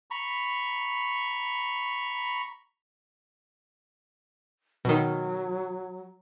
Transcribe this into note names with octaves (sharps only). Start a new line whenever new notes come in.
A#5 B5 C#6
B2 D#3 F#3